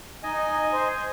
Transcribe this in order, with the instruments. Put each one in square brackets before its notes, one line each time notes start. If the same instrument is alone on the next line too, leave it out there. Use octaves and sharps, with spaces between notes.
[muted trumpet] D#4 [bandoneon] D#5 G#5
[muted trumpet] C5